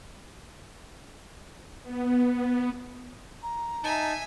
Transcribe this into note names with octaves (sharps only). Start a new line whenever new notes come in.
B3
A#5
D#4 E5 G#5 A5